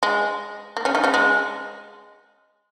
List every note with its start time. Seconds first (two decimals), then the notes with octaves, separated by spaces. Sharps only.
0.03 G#3
0.77 A#3
0.85 C#3 C#4
0.95 D#3 D#4
1.04 C#3 C#4
1.14 G#3